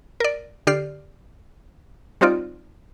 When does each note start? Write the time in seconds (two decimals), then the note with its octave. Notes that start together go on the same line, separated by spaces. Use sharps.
0.20 A#4 D5
0.67 D3 G4 D5 F6 C7
2.21 G3 C4 D#4 F4 D5